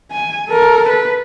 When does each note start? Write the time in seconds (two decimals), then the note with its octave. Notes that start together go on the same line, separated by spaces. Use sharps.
0.12 G#5
0.48 A4 A#4
0.89 B4